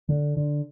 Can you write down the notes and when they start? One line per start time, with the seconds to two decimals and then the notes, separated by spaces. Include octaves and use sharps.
0.09 D3
0.37 D3